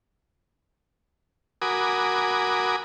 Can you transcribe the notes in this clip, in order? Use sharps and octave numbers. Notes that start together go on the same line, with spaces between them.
F#4 A#4 G#5 B5 D6 D#6